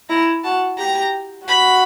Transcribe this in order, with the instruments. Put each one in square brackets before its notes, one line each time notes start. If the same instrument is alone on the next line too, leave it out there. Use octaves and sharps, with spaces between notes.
[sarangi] E4 [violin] A#5
[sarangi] F#4 [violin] A5
[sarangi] G4 [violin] A#5
[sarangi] F#4 [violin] B5